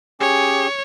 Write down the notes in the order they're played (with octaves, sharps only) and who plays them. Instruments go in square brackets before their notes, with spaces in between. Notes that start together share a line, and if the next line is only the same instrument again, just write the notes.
[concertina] C#4 G4 G#4 [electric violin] C#5